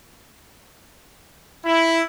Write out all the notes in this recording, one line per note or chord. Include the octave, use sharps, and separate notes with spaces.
E4